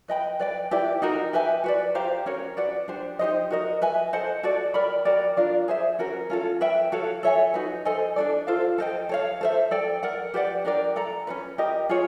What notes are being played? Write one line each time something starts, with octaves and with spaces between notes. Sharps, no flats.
B4 D#5 G5 B5
B4 D5 G5
E4 G4 B4 D5
D#4 F#4 A#4
G4 B4 E5 G#5
F#4 B4 D5
G4 C5 F5 A#5
C#4 F#4 A#4 C#5
F#4 B4 D5 F#5
D4 G4 C5
D#4 G4 C5 D#5
F#4 A#4 D#5
B4 E5 G#5
A4 C5 D#5 F#5
F#4 A4 D5
A#4 D5 G5 B5
F#4 A#4 D5 G5
D4 F4 A#4 D5
G#4 C5 E5
C#4 F#4 A#4
C#4 F4 A4
B4 E5 G5
F#4 A4 C#5 F5
A4 C#5 E5 G#5
D#4 F#4 B4
A4 C5 D#5 G#5
D4 F#4 A4 D5
F4 A4 C5 F5
A4 C5 D#5 G5
A4 C#5 F5
A4 C5 E5
A4 D5 G5
A#4 D5 F#5
G4 B4 D5 F#5
D4 G4 A#4 D5
A4 D5 F#5 A#5
C#4 F#4 B4
G4 A#4 D#5
F4 G#4 C#5